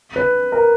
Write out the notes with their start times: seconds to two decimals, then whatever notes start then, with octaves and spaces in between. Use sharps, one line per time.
0.16 B4
0.52 A#4